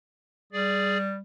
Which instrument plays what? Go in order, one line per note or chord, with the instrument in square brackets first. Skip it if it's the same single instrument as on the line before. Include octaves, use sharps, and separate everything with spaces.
[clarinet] G3 [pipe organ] G#4 D5